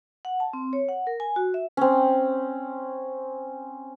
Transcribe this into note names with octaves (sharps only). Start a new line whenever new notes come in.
F#5
A5
C4
C#5
F#5
A#4
G#5
F#4
E5
C4 C#4